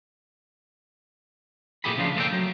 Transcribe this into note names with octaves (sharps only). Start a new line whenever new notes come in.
A#2 C#3 A3 G4 G#4 B5
C#3 F3 D4 F4
A3 A#3 D5 E5 G5
F#3